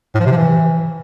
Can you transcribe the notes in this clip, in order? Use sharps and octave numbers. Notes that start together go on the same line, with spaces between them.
A2
F3
C3
F3
E3